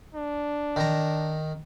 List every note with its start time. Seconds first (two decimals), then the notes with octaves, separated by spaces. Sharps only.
0.14 D4
0.76 D#3 A#5